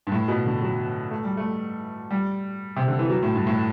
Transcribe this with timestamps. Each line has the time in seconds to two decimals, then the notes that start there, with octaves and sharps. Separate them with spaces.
0.07 G2
0.12 A2
0.28 B2
0.45 D3
0.62 F#3
1.11 A3
1.24 G3
1.37 A3
2.11 G3
2.76 C3
2.88 D3
2.99 E3
3.10 F#3
3.23 A2
3.35 G2
3.47 A2